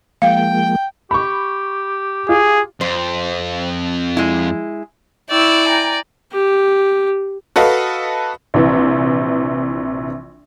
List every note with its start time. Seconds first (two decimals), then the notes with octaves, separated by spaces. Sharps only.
0.22 F3 G#3 A#3 F5 G5
1.11 G4 B5 C#6
2.29 F4 G#4
2.81 F2 C5
4.17 G#3 E4
5.30 E4 D5 G5 C#6 E6
5.68 G5 G#5 A#5
6.33 G4
7.56 F#4 A4 B4 D#5 F5
8.54 A#1 C3 E3